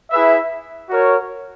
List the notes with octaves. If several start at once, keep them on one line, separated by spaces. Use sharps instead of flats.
E4 G#4 B4 E5
F#4 A#4 C#5